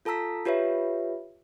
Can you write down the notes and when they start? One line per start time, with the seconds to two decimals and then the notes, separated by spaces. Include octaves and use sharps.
0.05 F4 A4 A5 A#5 E6 B6
0.45 F4 G4 B4 C#5 E5